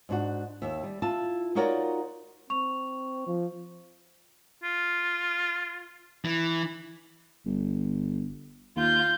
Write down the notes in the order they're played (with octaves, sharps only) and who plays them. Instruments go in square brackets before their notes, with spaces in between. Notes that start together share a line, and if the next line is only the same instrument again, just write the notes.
[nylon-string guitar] G#2 D4 F#4
D#2 E5
G3
E4 F4 A5
D#4 F4 F#4 A#4 C#5 D5
[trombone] C4 [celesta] C#6 F7
[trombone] F3
[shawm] F4
[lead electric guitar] E3
[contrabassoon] G1
[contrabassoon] D#2 [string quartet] F4 G6